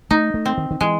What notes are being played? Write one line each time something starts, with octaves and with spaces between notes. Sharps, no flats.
A3 D#4
A3
C4
D#3
D#3
E3 G#3